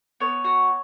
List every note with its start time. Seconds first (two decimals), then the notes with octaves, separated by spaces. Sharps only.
0.20 B3 C#5
0.44 F#4